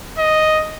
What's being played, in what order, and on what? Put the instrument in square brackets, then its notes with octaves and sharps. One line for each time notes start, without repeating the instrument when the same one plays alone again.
[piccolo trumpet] D#5